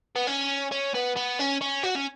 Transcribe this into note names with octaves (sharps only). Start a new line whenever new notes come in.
B3
C#4
C#4
B3
B3
C#4
C#4
F#4
C#4